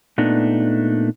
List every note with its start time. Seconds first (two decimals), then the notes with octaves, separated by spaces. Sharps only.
0.18 A#2 A3 B3 D4 D#4